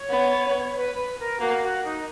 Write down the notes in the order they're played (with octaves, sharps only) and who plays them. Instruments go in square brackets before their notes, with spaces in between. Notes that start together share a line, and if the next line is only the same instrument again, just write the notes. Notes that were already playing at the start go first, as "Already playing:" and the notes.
Already playing: [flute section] C#5
[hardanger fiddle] B3
[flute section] B4
B4
A#4
[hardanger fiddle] A#3 [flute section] F#4
[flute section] F#4
D#4